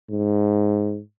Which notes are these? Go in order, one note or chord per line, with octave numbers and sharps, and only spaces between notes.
G#2